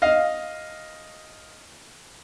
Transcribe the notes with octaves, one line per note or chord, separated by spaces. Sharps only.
D#5 F5